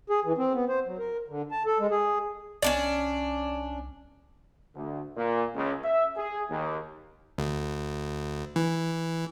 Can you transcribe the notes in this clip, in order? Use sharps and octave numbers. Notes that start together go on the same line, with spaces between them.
G#4
E3
C4
B3
C5
F#3
A#4
D3
A5
A4
G#3
G#4
C2 C#4 D4 D5
D2
A#2
C#2
E5
G#4
D#2
D2
E3